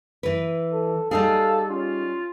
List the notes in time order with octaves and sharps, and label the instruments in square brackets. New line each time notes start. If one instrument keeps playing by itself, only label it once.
[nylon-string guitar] E3 B4
[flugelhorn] A4
[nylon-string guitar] G3 D#4 G#4 [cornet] A4 [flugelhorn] F5
[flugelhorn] C#4 [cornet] F4